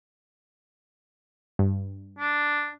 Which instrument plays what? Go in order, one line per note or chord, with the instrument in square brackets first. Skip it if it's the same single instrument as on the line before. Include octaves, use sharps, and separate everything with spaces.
[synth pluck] G2
[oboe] D4